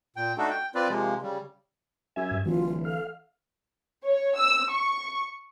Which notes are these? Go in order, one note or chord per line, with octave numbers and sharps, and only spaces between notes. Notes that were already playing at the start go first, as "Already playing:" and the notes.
A#2 G5
A3 D4 D#4 F#4 A4
G5
C4 F4 B4 D5
C3 F3 G#3 A#3
C#3 G3
F#2 E5 G#5
G2
D1 E3 F#3 F4
A4 F5
C#5
E6
C#6